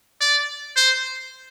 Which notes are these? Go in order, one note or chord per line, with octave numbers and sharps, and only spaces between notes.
D5
C5